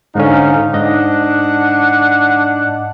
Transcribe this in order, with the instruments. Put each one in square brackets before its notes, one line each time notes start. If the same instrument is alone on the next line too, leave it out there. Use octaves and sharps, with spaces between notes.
[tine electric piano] G#2 D3 C#4 [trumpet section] D#4 F5
[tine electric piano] G#2 D#5 [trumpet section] D4 F#5